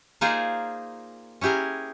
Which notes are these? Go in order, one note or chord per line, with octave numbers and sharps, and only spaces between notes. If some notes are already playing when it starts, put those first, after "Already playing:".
A#3 D#4 F4 G#4 C5 D5
C#4 E4 G4 G#4 A#4